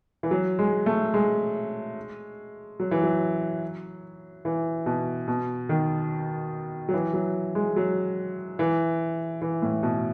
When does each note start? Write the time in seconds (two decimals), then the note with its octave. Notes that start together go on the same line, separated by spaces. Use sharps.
0.23 E3
0.31 F#3
0.59 G#3
0.86 A3
1.14 G#3
2.80 F#3
2.91 E3
3.03 F#3
4.45 E3
4.86 B2
5.28 B2
5.69 D#3
6.89 F#3
6.94 E3
7.13 F#3
7.55 G#3
7.76 F#3
8.59 E3
9.42 E3
9.62 A2
9.83 B2